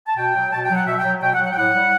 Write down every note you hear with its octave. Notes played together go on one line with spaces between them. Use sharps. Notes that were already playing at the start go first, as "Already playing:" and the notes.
A5
B2 G5
F#3
B2 A5
G5
F#3
F#5
B2 E5
G5
F#3
B2 G5
F#5
F#3
F#5
G5
A2 F#5
G3